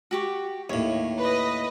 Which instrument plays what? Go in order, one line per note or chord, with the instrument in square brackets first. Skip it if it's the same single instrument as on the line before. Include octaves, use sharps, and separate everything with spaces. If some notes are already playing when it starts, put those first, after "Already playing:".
[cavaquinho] F#4 G4 C#6
[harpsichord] D#2 A2 [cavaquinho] C#5
[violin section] B4 D#5